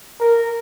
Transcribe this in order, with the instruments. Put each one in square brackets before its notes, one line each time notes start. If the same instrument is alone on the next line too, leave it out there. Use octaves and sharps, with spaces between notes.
[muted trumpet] A#4